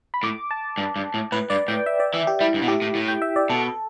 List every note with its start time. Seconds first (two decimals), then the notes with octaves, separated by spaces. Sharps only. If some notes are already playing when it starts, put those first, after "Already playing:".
0.14 B5
0.23 A2 D6
0.51 A5
0.78 G2
0.96 G2
1.14 A2
1.32 A2 B4
1.50 G2 D5
1.68 A2 G5
1.86 E5
2.00 D5
2.14 E3
2.27 G4
2.41 G3 E4
2.54 G2
2.62 B2
2.68 A2 G4
2.82 A2
2.95 A2
3.08 G5
3.22 E5
3.36 D5
3.50 B2 A4